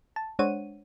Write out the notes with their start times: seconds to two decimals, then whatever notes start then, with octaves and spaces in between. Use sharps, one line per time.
0.16 A5
0.39 G#3 D4 C5 C#5 F#5 D#7